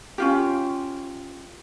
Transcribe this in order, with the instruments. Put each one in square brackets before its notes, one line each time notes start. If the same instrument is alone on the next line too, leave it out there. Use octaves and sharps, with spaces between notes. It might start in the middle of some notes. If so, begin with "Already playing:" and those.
[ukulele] C#4 F4 G4